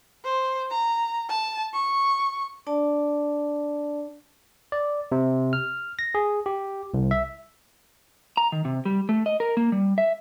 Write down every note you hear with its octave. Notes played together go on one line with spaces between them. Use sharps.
C5
A#5
A5
C#6
D4 D5 A5
D5
C3
F6
A#6
G#4
G4
C2
E5
A#5
D#3
C3
G3
A3
D#5
A#4
A#3
G3
E5